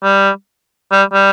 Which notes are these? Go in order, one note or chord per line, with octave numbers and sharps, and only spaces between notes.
G3
G3
G3